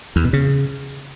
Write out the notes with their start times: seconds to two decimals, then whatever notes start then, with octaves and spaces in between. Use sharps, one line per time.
0.16 E2
0.24 B2
0.33 C#3